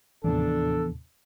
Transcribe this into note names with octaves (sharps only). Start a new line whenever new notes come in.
D#2 A2 C3 E3 F3 B3 D4 A4